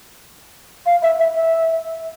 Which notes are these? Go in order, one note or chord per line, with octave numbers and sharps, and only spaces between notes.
F5
E5
E5
E5